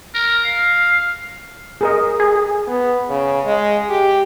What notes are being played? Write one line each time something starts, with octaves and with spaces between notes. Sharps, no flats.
A#4
F5
G#4 A#4 D#5
G#4
B3
C#3
G#3
G4